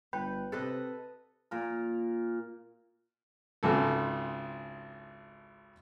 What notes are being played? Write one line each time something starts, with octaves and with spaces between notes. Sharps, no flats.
G1 B4 G5 B5 G6
C3 A4 B4 D#5
A#2 A#4
G#1 C#2 A4